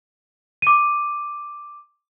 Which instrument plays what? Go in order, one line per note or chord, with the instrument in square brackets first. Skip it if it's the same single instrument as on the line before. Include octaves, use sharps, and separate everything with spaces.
[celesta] D6 D#7